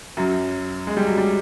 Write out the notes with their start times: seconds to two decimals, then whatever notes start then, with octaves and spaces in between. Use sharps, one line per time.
0.17 F#2 F#3
0.87 G#3
0.97 G3
1.07 F#3
1.18 G3